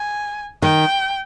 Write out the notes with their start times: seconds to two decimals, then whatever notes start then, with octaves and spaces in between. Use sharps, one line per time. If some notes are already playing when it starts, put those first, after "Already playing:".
Already playing: G#5
0.62 D#3 G5